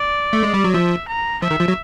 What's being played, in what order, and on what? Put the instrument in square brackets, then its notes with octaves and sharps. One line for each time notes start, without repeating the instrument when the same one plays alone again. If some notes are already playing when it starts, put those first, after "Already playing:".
Already playing: [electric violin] D5
[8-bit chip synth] A3
G#3
G3
F#3
[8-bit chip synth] F3 [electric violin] E5
[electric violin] A#5
[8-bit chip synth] F3 [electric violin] E5
[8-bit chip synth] D#3
F3
F#3